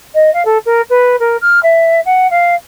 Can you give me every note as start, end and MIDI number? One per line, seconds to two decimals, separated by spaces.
0.14 0.33 75
0.34 0.45 77
0.45 0.58 69
0.66 0.81 70
0.90 1.16 71
1.20 1.37 70
1.41 1.60 89
1.63 2.00 76
2.05 2.30 78
2.30 2.54 77